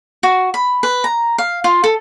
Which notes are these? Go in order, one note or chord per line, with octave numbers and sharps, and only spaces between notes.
F#4
B5
B4
A#5
F5
F4
A4